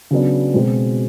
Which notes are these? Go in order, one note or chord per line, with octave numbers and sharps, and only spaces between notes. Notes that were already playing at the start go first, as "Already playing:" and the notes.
C#3 F#3 B3 D4
B2 G#3 C4